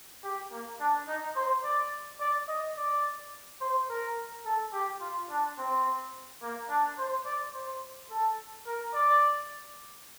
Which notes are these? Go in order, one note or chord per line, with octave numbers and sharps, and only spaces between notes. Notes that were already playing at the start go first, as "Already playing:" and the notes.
G4
A#3
D4
D#4
C5
D5
D5
D#5
D5
C5
A#4
A4
G4
F4
D4
C4
A#3
D4
C5
D5
C5
A4
A#4
D5